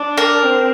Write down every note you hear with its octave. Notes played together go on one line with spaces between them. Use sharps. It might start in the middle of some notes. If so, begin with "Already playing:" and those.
Already playing: D4
A#4
C4